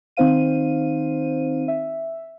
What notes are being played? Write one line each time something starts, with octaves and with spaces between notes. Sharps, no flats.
D#3 C4 D#4 C5 F5 D#7
E5